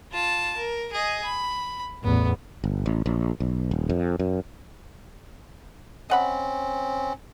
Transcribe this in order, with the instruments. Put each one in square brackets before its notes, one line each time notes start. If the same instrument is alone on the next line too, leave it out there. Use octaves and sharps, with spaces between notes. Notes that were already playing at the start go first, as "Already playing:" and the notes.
[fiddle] F4 A5
A#4
G#4 D#5
B5
[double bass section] A1 E2 [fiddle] B3
[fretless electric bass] G1
A1
A#1
B1
D#1
F2
F#2
[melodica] C4 C#4 [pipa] D#5 F#5 B5